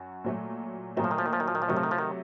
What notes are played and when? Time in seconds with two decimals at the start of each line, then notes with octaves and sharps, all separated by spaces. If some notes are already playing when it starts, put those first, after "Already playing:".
Already playing: F#2 F#4
0.24 A#2 F#3 A3
0.96 A#2 D#3 F#3 A3
1.04 F3
1.11 D#3
1.18 F3
1.26 D#3
1.33 F3
1.40 D#3
1.48 F3
1.55 D#3
1.62 F3
1.68 C3 D#3 F#3 A3
1.77 F3
1.83 D#3
1.91 F3
1.98 D#3